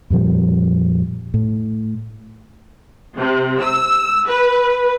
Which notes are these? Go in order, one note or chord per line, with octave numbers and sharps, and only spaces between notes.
F2 A#2 F3 G3
A2
C3
E6
B4